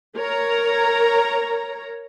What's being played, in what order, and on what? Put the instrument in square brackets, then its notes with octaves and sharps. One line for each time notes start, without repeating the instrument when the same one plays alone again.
[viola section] A#4 C#5 A#5